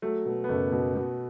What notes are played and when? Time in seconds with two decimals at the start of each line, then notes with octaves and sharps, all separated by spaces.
0.02 F#3 A3
0.26 B2
0.44 B3
0.49 F#1 A3
0.72 B2
0.95 B2